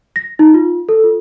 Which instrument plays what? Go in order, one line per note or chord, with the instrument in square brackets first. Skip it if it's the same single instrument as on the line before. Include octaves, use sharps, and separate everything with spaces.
[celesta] A#6
D#4
F4
A4
F4